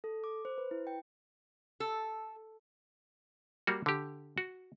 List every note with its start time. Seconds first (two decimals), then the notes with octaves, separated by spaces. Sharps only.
0.04 A4
0.24 D6
0.45 C5
0.58 B4
0.71 E4
0.87 G5
1.80 A4
3.67 G3 A#3 F#4
3.86 D3 G4
4.38 F#4